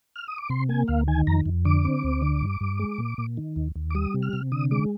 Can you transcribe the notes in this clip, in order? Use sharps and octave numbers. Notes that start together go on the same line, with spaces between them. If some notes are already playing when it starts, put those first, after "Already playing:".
F6
D#6
D6
C3 C6
A#3 G#5
D2 F5
D#3 G#5
F2 A#5
F2
D3 D6
C4
D2
D3
G2
G2
G#3
A#2
A#2
D#3
D#2
D#2
D6
G3 D#6
C3
F6
C3
D3 D#6
G#3 D6